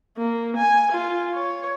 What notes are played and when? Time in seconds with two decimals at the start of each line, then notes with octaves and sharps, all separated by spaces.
0.17 A#3
0.57 G#5
0.92 F4
1.34 C#5